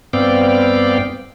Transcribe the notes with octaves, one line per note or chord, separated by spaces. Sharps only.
G2 B3 C4 D5 F5 G5